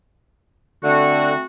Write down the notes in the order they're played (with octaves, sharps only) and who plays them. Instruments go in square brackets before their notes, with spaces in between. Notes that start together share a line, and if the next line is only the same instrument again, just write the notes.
[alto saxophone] D3 [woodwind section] A3 C4 F#4